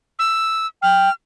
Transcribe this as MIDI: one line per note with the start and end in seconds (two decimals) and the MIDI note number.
0.19 0.67 88
0.83 1.09 79
0.83 1.13 89